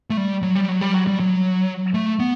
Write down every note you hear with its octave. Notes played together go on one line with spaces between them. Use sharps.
A3
G3
F#3
G3
F#3
G3
F#3
G3
F#3
A3
B3